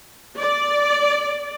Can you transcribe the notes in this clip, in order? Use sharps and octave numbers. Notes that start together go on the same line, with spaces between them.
D5